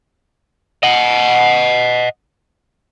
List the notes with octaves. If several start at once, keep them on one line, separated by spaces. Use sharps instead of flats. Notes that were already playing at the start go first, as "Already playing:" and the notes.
D#5 F#5